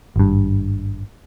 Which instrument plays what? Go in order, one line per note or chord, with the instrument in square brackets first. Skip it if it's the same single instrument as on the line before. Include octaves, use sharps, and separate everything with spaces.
[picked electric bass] G#1 G2